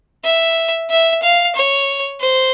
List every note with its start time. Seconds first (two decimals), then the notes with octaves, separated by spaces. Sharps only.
0.24 E5
0.90 E5
1.22 F5
1.55 C#5
2.21 C5